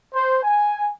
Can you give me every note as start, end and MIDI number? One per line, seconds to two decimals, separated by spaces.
0.13 0.38 72
0.43 0.90 80